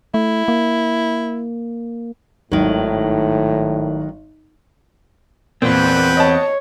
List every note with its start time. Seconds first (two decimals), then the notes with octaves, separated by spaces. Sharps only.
0.14 A3 E4
0.48 A#3
2.52 G#1 A2 D#3 F#3
5.62 E2 A#2 C4 B4 F#5 G5
6.17 C#5 D#5 A5